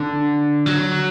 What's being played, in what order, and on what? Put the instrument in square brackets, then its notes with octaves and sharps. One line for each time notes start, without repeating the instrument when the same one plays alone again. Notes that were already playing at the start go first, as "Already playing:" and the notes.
Already playing: [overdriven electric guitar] D3
F#3